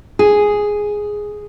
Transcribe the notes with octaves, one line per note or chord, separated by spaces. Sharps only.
G#4